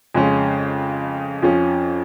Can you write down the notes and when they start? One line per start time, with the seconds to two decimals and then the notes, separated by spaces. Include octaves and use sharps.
0.15 F2 C#3 G#3 C#4
1.42 F2 F3 C#4